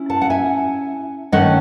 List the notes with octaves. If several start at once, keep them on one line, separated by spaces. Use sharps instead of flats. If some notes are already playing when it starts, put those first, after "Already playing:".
Already playing: C#4 E4
F#5 A5
F#5
E5 G#5
D#3 A3 C#4 D#5 F#5